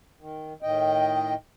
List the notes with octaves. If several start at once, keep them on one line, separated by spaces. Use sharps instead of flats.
D#3
A2 D#3 D#5 G5